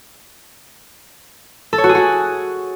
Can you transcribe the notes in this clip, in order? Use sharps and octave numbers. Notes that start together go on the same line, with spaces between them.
A4
C#5
F#4
G#4
F#4